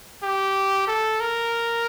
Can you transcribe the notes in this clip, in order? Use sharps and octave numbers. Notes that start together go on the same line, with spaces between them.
G4
A4
A#4